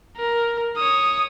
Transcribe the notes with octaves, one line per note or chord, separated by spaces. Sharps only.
A#4
C#5 D#6